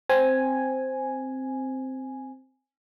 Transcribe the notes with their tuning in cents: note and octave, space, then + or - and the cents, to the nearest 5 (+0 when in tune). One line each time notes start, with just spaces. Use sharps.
C4 +0 G#5 +0